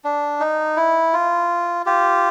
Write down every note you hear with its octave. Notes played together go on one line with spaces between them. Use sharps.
D4
D#4
E4
F4
F4 G4